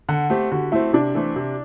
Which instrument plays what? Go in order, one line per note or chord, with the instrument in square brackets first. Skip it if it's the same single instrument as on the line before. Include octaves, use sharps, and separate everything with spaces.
[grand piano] D3 [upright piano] F#5
[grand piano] A3 C4 [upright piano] G4
[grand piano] D3 [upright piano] F#4
[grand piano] A3 C4 [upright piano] E4
[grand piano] C3 [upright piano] D4
[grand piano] E3 A3 C4
C3